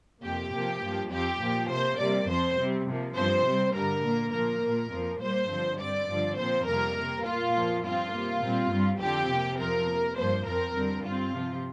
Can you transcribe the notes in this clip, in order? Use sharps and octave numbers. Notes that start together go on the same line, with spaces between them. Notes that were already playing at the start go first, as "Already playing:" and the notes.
F2 C3 A#3 G4
C3 F3 A#3
G2 F3 A#3
F2 F3 C4 G4
A#2 F3 A#3
C3 A#3 C5
C3 G3 A#3 D5
F2 F3 C4 C5
C3 G3 C4
C3 F3 A#3
G2 F3 C4 C5
C3 G3 C4
G2 D3 G3 A#4
A#2 A#3
A#2 F3 A#3 A#4
A#2 A#3
F2 F3 A#3
A#2 G3 A#3 C5
G2 D3 F3 C4
G2 G3 C4 D5
G2 D3 F3 C4
A#2 F3 C4 C5
F2 C3 G3 A#3 A#4
C3 A#3
A#2 A#3 F4
F2 F3 A#3
G2 F3 C4 F4
C3 A#3
A#2 G3 C4
G2 G3 C4
F2 D3 F3 C4 G4
C3 A#3
F2 F3 C4 A#4
C3 A#3
G2 F3 A#3 C5
F2 F3 C4 A#4
F2 D3 G3 C4
G2 G3 C4 F4
C3 F3 C4